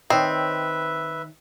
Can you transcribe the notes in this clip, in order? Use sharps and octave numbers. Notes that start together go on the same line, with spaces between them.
D#3 C4 B4 C#5 D#5 E5